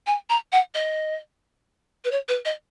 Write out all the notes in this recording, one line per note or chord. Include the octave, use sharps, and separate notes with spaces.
G#5
A#5
F#5
D#5
B4
C#5
B4
D#5